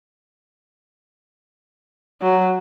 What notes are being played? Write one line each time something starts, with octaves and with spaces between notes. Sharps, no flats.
F#3